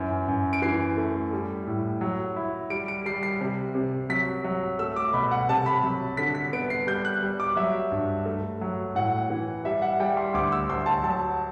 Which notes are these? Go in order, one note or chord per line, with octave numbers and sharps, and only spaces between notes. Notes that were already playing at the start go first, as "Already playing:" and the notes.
Already playing: F#2 E3
F#2
D7
E3 C7
A3
G3
A2
F#3
E4
G3 D7
D7
G3 C7
C7
C3
C3
F#3 B6
F#3
A3 E6
D6
B2 B5
F#5
C3 A5
B5
F#3
D3 B6
B6
B3 D7
C7
G3 G6
F#6
G3
D6
F#3 E5
G2
A3
F#3
A2 F#5
E3
G3 E5
F#5
G3 G5
C6
D2 D6
E6
D2 C6
A5
F#3 A5